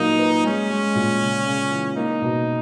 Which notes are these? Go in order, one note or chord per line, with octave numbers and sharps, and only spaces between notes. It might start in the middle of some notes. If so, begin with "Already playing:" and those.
Already playing: A#2 F#3 A#3 D#4
B4
G#3 C#4
G#3
A#2
C#3
C#3
E3
A#3 D#4
B2